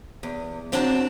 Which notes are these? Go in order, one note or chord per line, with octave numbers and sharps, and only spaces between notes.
E2
F#2 C4 D4 F#4 G5 A5